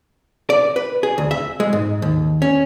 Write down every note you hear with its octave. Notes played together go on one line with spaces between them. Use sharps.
D5
B4
G#4
D2
E5
G#3
G#2
D#2
C#4